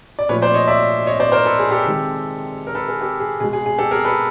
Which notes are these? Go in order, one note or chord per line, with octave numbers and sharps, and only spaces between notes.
D5
A#2 F3 A3 B4 C#5
C5 D5
C#5 D#5
D5 E5
C#5 D#5
C5 D5
A#4 C5
A4 B4
G#4
G4 A4
C3 D#3 G#3
A#4
A4 B4
G#4 A#4
G4 A4
G#4
B2 G#3 G#4
G#4
G#4
G4 A4
G#4 A#4
A4 B4